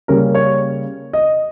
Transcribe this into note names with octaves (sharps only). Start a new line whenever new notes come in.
C#3 G3 A#3 C#4 A#4
C#5
D#5